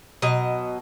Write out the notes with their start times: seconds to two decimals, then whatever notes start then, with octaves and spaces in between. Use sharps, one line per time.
0.22 B2 F#3 D#5